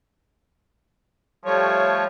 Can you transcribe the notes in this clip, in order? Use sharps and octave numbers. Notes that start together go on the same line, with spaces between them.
F3 G3 A3 C#5